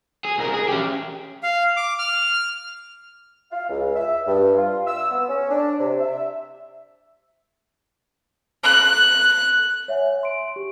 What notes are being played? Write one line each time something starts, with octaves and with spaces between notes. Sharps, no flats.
G#4
C2 A#4
G#4
C#4 G4
F5
D6
F6
F5
C#2
E5
G2
F4
E6
B3
C#4
D4
C3
E5
F#6
C#5 E5 F#5 G#5
C6 D7
G4